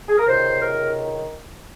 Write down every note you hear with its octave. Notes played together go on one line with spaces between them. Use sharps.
G#4
A#4
C#2 C3 D#3 C5
A#4